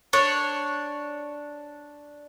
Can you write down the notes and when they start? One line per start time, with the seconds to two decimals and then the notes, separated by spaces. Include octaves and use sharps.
0.13 D4 C#5